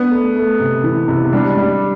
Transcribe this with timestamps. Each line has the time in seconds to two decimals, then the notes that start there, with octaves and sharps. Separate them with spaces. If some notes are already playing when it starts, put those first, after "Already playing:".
Already playing: B3 D4
0.11 A3
0.35 A3
0.60 C3
0.84 E3
1.08 C3
1.33 G3 D4
1.57 G3